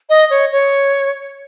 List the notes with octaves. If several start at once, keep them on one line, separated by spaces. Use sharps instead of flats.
D#5
C#5
C#5